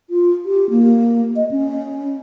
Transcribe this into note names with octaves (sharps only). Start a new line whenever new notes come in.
F4
G4
A#3
D#5
C#4